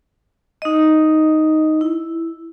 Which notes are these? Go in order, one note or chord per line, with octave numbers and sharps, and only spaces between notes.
D#4 D#5
E4